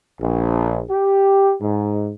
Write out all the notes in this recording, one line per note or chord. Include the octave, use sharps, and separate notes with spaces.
A#1
G4
G#2